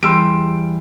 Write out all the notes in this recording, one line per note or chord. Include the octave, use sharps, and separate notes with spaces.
E2 G3 C6 E6 D7